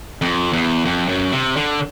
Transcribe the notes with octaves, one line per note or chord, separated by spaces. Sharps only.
F2
E2
F2
F#2
C3
D3